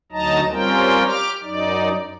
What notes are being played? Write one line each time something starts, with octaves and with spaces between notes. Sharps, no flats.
D2 F#3 D#4 D#5 A5 A#5
G3 C4 C#4 F4 A#4 G5
G4 D6 F6
F#2 D#4 D5